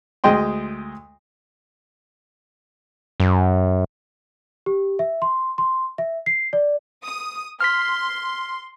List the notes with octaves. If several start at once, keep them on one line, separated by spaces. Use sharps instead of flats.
D2 G#3 D#5 G5 C6
F#2
G4
E5
C6
C6
E5
C7
D5
D#6
C6 F6 B6